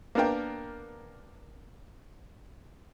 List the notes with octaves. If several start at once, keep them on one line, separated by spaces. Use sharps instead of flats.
A#3 B3 D4 A#4 G5